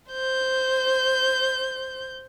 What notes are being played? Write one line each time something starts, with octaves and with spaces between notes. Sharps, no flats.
C5 G6